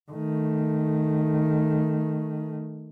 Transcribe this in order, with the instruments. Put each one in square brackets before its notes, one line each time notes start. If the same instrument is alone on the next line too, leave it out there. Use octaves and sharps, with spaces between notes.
[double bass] D#3 A3